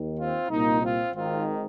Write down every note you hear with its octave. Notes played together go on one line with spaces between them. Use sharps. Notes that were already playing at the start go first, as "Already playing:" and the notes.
Already playing: D#2 D#3
C4 F4
C2 A#2 A#3 D#4
C4 F4
G#1 G#2 D#3 C4 F4